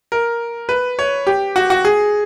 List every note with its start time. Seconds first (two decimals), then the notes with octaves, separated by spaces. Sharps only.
0.12 A#4
0.69 B4
0.99 C#5
1.27 G4
1.56 F#4
1.70 F#4
1.85 G#4